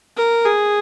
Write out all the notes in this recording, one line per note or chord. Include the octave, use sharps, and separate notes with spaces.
A#4
G#4